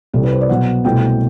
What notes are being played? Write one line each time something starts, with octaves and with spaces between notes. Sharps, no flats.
C2 C3 G3 A4
B4
C5
D5
B2 F#3 B3 F#5
C2 B2 A3 C4 G5